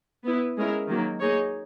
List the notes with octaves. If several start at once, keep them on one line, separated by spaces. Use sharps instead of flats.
B3 E4 B4
G#3 C#4 E4 A#4
D#3 F#3 A#3
A#3 D#4 G#4 C#5